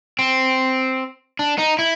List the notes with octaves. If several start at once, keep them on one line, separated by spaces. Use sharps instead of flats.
C4
D4
D#4
E4